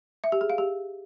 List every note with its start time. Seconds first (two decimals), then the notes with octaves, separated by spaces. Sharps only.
0.24 E5
0.32 G4
0.41 G#4
0.50 F5
0.58 G4